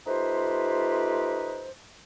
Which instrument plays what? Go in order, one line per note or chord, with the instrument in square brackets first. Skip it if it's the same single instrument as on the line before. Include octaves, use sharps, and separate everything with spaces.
[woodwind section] A3 D#4 F4 G4 B4 C5